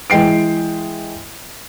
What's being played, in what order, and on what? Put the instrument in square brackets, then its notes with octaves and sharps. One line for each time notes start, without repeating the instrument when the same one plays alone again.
[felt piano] E3 G#3 G5 C7 D7